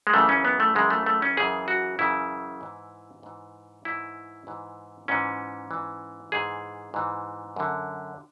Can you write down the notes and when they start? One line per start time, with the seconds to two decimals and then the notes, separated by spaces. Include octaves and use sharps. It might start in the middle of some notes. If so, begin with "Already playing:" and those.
0.07 G#3
0.13 F#2 C#3 E3 A3
0.29 C#4
0.45 B3
0.60 A3
0.75 F#2 C#3 E3 G#3
0.90 A3
1.06 A3
1.22 C#4
1.37 F#2 C#3 E3 G#4
1.68 F#4
1.99 F#2 C#3 E3 E4
2.61 G#2 E3
3.23 G#2 E3
3.85 G#2 E3 E4
4.47 G#2 E3
5.08 G#2 E3 C#4
5.71 G#2 E3
6.32 G#2 E3 G#4
6.94 G#2 E3
7.56 F#2 D3